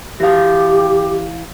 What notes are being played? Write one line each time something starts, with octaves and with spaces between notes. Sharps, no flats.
E3 G4 F5